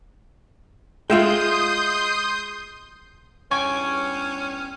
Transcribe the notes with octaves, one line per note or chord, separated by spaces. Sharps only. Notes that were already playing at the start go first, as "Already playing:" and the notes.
G#3 F4 E5 G5 C6 D#6 G6
E2 G2 C#4 C#5 G5 G#5 C#6